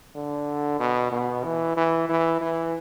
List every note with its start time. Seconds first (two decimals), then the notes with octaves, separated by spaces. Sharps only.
0.15 D3
0.79 B2
1.12 B2
1.44 E3
1.76 E3
2.09 E3
2.41 E3